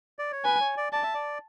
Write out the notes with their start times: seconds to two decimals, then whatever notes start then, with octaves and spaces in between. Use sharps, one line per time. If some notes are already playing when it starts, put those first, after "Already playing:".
0.19 D5
0.32 C#5
0.44 B4 G#5
0.60 C#5
0.77 D5
0.93 D5 A5
1.03 E5
1.14 D5